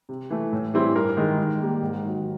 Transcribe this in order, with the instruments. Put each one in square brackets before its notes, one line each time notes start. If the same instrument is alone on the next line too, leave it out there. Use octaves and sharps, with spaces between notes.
[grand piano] C3
E3 A3
A2
E3 G3 C4 E4
G2 A#4
D#3 G#3
D#3
G3 A#3
G#2
D#3 F#3